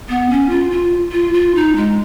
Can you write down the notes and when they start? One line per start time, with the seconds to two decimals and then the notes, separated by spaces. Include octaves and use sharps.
0.08 B3
0.29 C#4
0.49 F4
0.71 F4
1.12 F4
1.33 F4
1.55 D#4
1.76 G#3